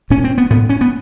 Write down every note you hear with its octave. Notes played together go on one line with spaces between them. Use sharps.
A#2 C#4
C4
B3
A2 B3
C#4
B3